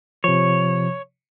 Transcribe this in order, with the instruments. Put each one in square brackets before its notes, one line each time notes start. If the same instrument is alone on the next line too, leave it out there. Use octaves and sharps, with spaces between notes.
[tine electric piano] C3 F3 [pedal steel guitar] C#5